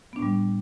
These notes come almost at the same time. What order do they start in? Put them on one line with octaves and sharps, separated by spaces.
B3 D4 A2 G3